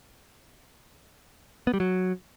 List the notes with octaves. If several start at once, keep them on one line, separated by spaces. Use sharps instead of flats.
B3
G3
F#3